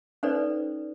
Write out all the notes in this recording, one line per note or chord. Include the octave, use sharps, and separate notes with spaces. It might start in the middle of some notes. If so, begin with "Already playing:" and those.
C#4 D#4 A4 B4 C5 D5